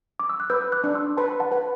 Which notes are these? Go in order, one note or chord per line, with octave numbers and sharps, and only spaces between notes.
D6
E6
F#6
B4 E6 G6
D6 F#6
D4
C6 E6
B4 A5 C6
F#5 A5
B4